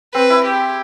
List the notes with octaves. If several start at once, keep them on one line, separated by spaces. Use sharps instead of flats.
C4 B4
E4
G4